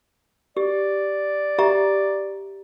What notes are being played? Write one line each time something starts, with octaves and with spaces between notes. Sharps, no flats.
G4 D5
G4 E5 A#5